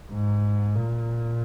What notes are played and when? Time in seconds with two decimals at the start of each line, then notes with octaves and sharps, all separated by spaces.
0.12 G#2
0.75 A#2